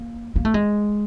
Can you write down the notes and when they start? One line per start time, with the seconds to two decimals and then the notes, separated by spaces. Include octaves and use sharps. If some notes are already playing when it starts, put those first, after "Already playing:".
Already playing: A#3
0.36 A#3
0.45 A3
0.54 G#3